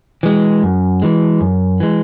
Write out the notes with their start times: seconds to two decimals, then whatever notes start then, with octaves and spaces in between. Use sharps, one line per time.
0.23 E3 G#3
0.63 F#2
1.02 E3 G#3
1.41 F#2
1.80 E3 G#3